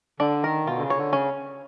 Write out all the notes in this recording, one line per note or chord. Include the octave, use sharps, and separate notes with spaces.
D3 D4
D#3 A#4
B2 F4
D3
C#3
C#5
D3
C#3 C#4